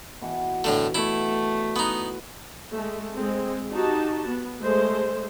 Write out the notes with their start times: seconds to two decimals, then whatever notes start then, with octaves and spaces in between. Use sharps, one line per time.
0.21 B2 E3 F#5
0.64 A2 D3 A3
0.95 A3 E4 B4 D5
1.76 B3 D#4 B4
2.71 G#3 A3
3.15 G#3 C4
3.72 D#4 F#4 G4 A5
4.27 B3
4.62 G#3 A3 C5